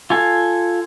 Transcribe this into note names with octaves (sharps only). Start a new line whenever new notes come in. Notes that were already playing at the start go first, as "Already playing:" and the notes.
F4 A4 G#5